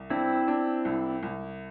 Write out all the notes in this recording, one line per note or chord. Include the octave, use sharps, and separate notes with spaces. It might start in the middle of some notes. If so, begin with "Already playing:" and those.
Already playing: C2
C4 D4 E4
D4
C2
C2